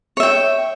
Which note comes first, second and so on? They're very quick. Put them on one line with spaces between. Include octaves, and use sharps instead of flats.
C#5 E5 G5